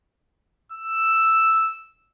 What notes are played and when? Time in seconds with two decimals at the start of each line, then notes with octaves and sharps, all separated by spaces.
0.72 E6